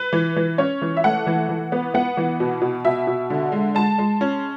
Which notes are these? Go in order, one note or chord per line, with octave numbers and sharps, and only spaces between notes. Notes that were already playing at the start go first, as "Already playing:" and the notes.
Already playing: B4
E3
E3
C#4 C#5
E3
E5
A3 F#5
E3
E3
B3
B3 F#5
E3
B2
B2
B2 E5
B2
D3
G#3
G#3 A5
G#3
C#4